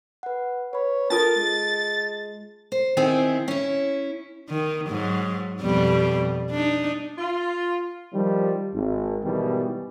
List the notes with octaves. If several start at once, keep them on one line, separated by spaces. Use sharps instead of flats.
B4 F#5
B4 C#5 B5
D4 F4 A4 A#4 A5 A6
G#3
C5
D#3 C4 E4 G#4
C#4 E4
D#3
G#2 F#3
F2 B2 G3
D4 D#4
F4
D#3 F3 G3
G#1
G#2 B2 D#3 E3 G3